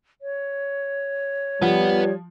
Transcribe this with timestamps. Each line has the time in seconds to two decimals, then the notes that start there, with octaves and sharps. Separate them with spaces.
0.22 C#5
1.62 F3 G3 B4 F#5